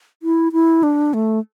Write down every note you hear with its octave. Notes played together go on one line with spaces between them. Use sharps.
E4
E4
D4
A3